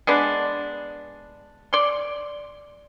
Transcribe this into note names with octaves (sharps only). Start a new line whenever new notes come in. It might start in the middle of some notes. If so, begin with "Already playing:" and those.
G#3 B3 D4
D5 C6